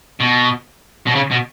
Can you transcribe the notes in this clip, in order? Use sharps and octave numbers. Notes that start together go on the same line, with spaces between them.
B2
B2
C#3
B2